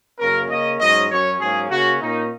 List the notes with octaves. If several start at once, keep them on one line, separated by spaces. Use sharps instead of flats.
F#2 C#3 A#3 C#4 A#4
C#3 A#3 C#4 D#5
G#2 F#3 C#4 D#5
F#2 F#3 C#4 C#5
G#2 F#3 A#3 C#4 G#4
C#3 A#3 C#4 F#4
A#2 A#3 C#4 D#4